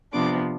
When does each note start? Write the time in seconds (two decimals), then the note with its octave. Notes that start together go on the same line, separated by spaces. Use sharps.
0.13 C3 F3 B3 D4 D6